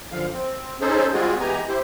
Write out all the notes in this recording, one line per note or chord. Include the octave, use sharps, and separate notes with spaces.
F#2 D3 F3 F5
C4
C#4 D#4 G#4 A4 C5
G3 G#3 C4 F4 F#4 G#4
E3 G#3 B3 G4 G#5 A#5
E4 G4 C5